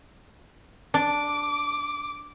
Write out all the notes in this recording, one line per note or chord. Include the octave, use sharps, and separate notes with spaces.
D4 D6